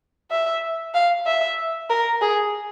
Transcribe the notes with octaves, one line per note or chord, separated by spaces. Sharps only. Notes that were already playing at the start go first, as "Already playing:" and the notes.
E5
F5
E5
A#4
G#4